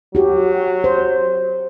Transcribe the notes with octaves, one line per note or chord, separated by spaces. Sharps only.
F#3 F#4 G4
C5